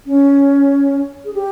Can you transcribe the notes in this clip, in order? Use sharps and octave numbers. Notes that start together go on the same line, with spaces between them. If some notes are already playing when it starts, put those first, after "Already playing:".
C#4
G#4
G4